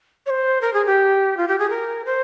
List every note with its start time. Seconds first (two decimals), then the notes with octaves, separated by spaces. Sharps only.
0.26 C#5
0.30 C5
0.61 A#4
0.74 G#4
0.86 G4
1.37 F4
1.48 G4
1.59 G#4
1.69 A#4
2.05 C5